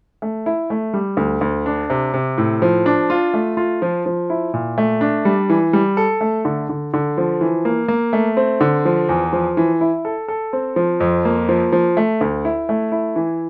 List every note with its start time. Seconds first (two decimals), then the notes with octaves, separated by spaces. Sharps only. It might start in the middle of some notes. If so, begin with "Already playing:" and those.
0.22 A3
0.46 E4
0.70 A3
0.94 G3
1.17 D2
1.41 D2
1.66 D4
1.90 C3
2.14 C3
2.38 A2
2.62 F3
2.86 D4
3.10 F4
3.34 A3
3.57 F4
3.82 F3
4.06 F3
4.30 E4
4.54 A#2
4.78 A3
5.01 D4
5.25 G3
5.50 E3
5.73 G3
5.97 A4
6.21 A3
6.45 D3
6.69 D3
6.94 D3
7.18 F3
7.41 E3
7.65 A#3
7.88 A#3
8.13 A3
8.37 C4
8.61 D3
8.85 F3
9.09 E2
9.33 F3
9.57 E3
9.81 E4
10.05 A4
10.28 A4
10.53 C4
10.76 F3
11.00 F2
11.25 A#3
11.49 F3
11.72 F3
11.97 A3
12.21 D2
12.45 E4
12.69 A3
12.92 E4
13.16 E3